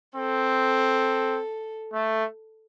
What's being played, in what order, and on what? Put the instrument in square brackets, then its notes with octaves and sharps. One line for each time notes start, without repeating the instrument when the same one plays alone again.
[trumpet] C4 [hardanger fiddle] A4
[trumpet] A3